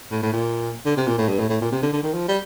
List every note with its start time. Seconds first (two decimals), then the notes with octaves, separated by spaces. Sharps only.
0.11 A2
0.22 A2
0.33 A#2
0.86 D3
0.97 C3
1.07 A#2
1.18 A2
1.29 G2
1.39 A2
1.50 A2
1.61 A#2
1.72 C3
1.83 D3
1.93 D3
2.03 D#3
2.14 F3
2.28 G3